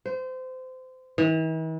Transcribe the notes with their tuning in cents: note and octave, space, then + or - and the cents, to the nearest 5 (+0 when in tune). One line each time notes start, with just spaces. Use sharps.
C5 -25
E3 -45